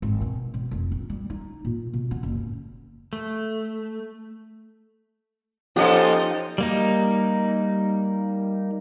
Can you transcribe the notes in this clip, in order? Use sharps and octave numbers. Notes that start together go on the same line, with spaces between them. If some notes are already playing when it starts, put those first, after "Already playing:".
G#1
B2
B2
F1
A#1
G3
D#4
A#2
B2
B3
F#1
A2
A3
F3 A#3 C#4 D#4 G4 A4 C5 D#5
G3 A#3 D#4